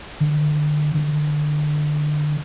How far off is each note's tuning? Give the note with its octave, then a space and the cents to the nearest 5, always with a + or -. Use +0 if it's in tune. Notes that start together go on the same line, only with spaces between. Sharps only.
D3 +30
D3 +25